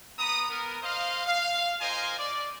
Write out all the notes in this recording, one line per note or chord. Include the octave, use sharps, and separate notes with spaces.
B3 A#5 B5 D#6
B3 A#4
C5 D#5 F5
F5
F4 A#4 C5 D#5 G#5
D5